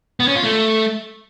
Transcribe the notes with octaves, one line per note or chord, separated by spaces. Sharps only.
B3
C#4
F4
A3